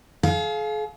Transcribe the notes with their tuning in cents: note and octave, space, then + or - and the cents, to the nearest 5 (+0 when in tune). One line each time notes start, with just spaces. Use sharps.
G#4 +45 F5 +0